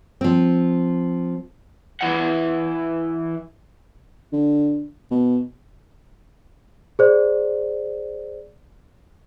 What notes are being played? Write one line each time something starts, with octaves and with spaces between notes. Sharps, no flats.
F3 C4
E3 F#5
D3
B2
G#4 C5 D5